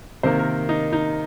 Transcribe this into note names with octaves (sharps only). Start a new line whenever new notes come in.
C3 D#3 A#3 C5
A#4
D#4
D#4